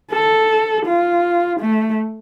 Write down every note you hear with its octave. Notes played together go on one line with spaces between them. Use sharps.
A4
F4
A3